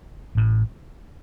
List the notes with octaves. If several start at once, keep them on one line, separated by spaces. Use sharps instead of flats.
A1 A2